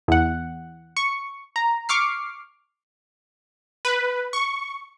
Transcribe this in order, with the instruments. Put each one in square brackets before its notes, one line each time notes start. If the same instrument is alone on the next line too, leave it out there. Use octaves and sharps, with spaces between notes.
[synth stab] E2 F#5
C#6
A#5
C#6 D6 F6 C7
[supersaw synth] B4
C#6